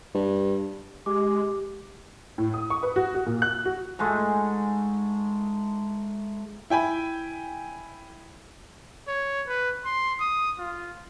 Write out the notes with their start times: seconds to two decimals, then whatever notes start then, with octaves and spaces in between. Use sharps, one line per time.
0.14 G2
1.06 G#3 G4 D6
2.38 A2
2.54 D#6
2.70 C#6
2.83 B4
2.96 F#4
3.14 F#4
3.26 A#2
3.42 F#6
3.65 F#4
3.99 G#2 G#3 A3
6.70 E4 G5 G#5 B5
9.08 C#5
9.48 B4
9.85 C6
10.20 D#6
10.59 F4